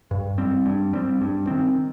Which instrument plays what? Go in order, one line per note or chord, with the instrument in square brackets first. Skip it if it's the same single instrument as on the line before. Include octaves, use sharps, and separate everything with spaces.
[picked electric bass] G2
G3 C4
G2
G3 C4
G2
D#3 C4